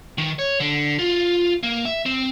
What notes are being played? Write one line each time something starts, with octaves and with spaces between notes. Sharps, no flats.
D#3
C#5
D3
F4
A#3
E5
C4